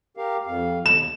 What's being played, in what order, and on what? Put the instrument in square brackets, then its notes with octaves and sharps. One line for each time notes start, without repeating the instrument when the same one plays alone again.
[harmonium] G4 A#4 F5
F2 F5
[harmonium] D#2 [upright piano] E7